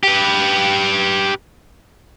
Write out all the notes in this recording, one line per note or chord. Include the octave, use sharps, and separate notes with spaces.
G4 B4